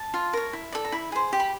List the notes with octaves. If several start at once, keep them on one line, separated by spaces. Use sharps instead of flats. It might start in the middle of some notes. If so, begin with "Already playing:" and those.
Already playing: A5
F4
A#4 C#5
E4
A4 D5
A#5
E4 B5
G#4 C5
G4
B5